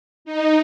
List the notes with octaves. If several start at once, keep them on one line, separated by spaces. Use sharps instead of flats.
D#4